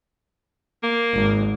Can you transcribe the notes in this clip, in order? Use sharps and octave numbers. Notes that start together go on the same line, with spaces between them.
A#3
G#1